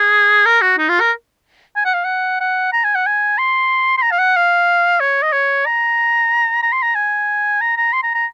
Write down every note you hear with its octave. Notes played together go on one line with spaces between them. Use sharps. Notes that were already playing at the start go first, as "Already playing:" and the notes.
Already playing: G#4
A#4
F#4
D#4
F4
A#4
G#5
F#5
F5
F#5
F#5
A#5
G#5
F#5
G#5
C6
C6
A#5
F5
F#5
F5
C#5
D#5
C#5
A#5
A#5
C6
A#5
G#5
A#5
A#5
C6
A#5
A#5